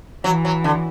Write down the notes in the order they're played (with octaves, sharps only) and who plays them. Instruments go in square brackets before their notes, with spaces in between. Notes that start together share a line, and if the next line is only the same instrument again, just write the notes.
[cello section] E3 [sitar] F#3
[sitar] F#3
D3